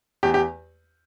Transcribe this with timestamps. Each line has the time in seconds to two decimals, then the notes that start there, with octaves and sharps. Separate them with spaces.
0.23 E2 G4
0.34 G4